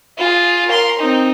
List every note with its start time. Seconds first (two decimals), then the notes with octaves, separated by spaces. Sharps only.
0.18 F4 G#4
0.67 A#4 C6
0.99 C4 D#4